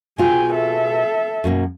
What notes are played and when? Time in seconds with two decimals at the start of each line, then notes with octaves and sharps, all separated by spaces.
0.18 B2 F4 G#4 G5 G#5
0.54 A4 E5
1.44 F#2 B2 A#3